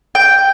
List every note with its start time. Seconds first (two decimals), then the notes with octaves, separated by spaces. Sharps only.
0.15 G5